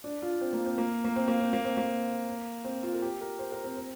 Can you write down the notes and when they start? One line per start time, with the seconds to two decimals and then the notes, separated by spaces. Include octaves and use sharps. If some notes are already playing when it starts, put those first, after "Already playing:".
0.04 D4
0.22 F4
0.41 C4
0.53 A#3
0.66 C4
0.78 A#3
1.05 A#3
1.16 C4
1.28 A#3
1.41 C4
1.53 A#3
1.65 C4
1.77 A#3
2.65 C4
2.83 F4
2.94 A#4
3.02 G4
3.21 A#4
3.39 C5
3.52 A#4
3.64 C4
3.77 C4